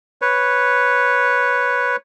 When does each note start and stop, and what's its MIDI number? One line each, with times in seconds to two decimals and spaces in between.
0.22 1.96 71
0.22 1.96 73